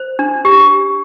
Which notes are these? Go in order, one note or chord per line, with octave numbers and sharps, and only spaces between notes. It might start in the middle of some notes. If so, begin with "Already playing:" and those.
Already playing: C5
D4
G4